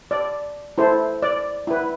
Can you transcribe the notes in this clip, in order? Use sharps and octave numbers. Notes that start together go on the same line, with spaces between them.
D5
E4 A4 C5
D5
E4 B4